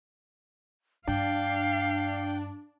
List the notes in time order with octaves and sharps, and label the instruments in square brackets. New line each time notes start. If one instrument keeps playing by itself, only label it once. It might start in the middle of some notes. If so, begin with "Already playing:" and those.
[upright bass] G2 [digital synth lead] D4 [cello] F5 [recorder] G5